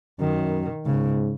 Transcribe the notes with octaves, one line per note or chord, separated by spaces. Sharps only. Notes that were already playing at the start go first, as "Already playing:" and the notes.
F#2 D#3
G#2 C#3